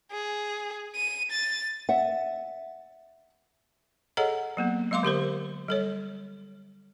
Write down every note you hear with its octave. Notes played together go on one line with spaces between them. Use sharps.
G#4
D#7
A6
E5 F#5
G#4 A4 C#5 D#5 F#5 A#5
F#3 A#3 B3
F#3 G#3 F5 C6 D6
D3 G4 A#4 C5
G3 A4 C#5